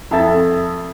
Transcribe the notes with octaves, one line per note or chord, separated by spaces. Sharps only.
F2 A4 E5 A6